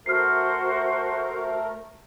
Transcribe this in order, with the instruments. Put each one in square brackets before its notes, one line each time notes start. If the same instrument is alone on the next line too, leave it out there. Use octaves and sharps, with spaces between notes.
[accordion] A3 A#4 [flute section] F#4 C5 [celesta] F6 C7